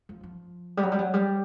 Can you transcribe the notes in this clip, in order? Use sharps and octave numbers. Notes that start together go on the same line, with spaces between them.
F3
F3
G3
F#3
G3
F#3
G3